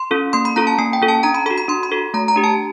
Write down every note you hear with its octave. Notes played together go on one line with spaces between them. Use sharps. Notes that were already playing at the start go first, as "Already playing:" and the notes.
Already playing: C6
C#4 F4 A4
A#3 C6
B5
C#4 F4 A4 A#5
A5
A#3 G#5
G5
C#4 F4 A4
A5
D4 A#5
B5
F#4 A4 B5
B5
D4 C6
B5
F#4 A4
A3 A#5
A#5
D4 G4
A5